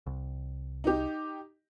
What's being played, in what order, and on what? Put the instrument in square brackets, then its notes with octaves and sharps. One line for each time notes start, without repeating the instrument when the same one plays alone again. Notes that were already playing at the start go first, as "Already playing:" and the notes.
[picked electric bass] C2
[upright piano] D#4 G4